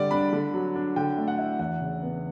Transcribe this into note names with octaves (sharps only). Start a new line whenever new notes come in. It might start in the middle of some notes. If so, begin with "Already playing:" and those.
Already playing: D3 G3 D5
D4 B5
D3
F#3
D4
D3 G5
A3
F#5
E4
E2 F#5
C#3
B3